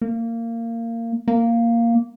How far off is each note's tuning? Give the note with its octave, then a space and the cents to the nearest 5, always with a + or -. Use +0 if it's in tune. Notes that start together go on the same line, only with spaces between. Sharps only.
A#3 -20
A#3 -5